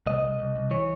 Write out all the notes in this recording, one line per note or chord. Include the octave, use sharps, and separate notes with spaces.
C2 D#5
C2
C2
C2
E3 C#5